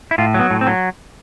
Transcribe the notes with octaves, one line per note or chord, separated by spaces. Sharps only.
E4
A2 F4
F#3
B3
A2
C4
F#3